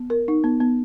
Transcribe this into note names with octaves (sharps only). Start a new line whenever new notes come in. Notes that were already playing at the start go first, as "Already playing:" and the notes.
Already playing: B3
A#4
D#4
B3
B3